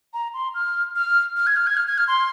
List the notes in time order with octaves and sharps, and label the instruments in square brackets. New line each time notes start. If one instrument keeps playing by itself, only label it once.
[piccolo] A#5
C6
F6
F6
F6
G#6
F6
G#6
F6
G#6
F6
C6